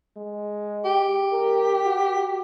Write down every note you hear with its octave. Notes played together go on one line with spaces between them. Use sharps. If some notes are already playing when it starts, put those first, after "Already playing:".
G#3
G4
A#4
F#4